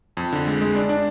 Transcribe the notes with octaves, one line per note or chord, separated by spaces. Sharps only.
F2
D3
G#3
G#3
D4
D4